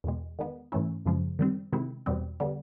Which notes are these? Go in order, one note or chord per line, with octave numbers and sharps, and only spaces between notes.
E2 B2 G#3
D#3 G#3 B3
G#2 E3 A3 C#4 E4
F#2 C#3 F3 G#3
D#3 G3 C4
C3 D#3 G#3 C4 E4
E2 B2 G3 C4
D3 G3 B3